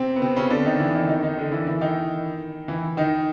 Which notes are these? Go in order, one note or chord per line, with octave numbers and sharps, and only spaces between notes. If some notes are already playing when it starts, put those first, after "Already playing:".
Already playing: C3 C4
B3
C3 C4
C#3 C#4
D3 D4
D#3 D#4
E3 E4
D#3 D#4
D#3 D#4
D#3 D#4
D3 D4
E3 E4
E3 E4
D#3 D#4
E3 E4
D#3 D#4